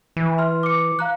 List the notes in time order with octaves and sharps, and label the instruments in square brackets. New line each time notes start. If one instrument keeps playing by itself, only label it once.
[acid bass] E3
[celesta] C6 F6
D6 C#7
F5 A#5 F#6